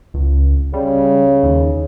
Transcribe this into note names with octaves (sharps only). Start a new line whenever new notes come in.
C#2
C#3 G3
D#2